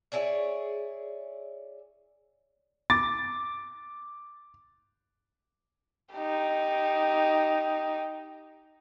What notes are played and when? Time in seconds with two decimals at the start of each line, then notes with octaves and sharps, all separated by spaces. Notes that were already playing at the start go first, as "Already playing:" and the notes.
0.12 E4 G#4 C#5 D5
2.90 D6 A6
6.14 D#4 G4